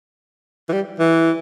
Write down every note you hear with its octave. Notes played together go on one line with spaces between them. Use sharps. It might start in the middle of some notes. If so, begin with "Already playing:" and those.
E3
G3
E3